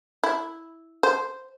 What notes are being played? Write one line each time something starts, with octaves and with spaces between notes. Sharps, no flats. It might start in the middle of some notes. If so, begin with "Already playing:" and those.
E4
C5